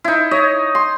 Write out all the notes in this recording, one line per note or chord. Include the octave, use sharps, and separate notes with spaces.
D#4 E4
C#5 D#5
C6